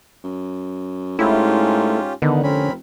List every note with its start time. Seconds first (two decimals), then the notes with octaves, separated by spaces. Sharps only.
0.24 F#2
1.19 G#2 A3 C#4 E4 F4 G4
2.22 D3 D#3 B3
2.43 F1 C4 C#4 A#4 B5